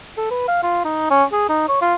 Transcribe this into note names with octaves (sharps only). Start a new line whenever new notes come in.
A4
B4
F5
F4
D#4
C#4
G#4
D#4
C#5
F4